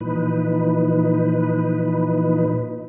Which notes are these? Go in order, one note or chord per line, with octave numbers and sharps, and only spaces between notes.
A#2 E3 F3 D#4 B4